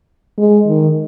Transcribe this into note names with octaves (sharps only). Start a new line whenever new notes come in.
G#3
D#3